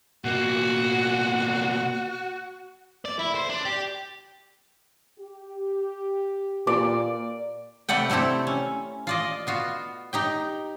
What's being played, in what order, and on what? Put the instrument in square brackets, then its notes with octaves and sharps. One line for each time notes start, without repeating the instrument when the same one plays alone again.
[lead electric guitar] B2 A#3 [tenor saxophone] F#4
[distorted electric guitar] D5
E4
C5
D4
G4
[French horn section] G4
[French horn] A#2 [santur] D5
[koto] C3 A3 B4 D5 F#5 G5
A3 C4 E4 G4 A4
C#4
F4 D5 D#5
B3 F4 F#4
D#4 G4 G5